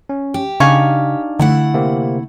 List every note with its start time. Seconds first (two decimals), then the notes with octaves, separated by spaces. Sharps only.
0.09 C#4
0.34 G4
0.60 C#3 D4 D#4 D5 F5 G#5 C#6
1.39 D3 A3 E4 F#5
1.74 C3 A#3 C4